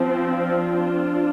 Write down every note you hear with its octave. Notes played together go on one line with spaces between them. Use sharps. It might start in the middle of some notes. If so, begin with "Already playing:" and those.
Already playing: F3 C4
D4 F4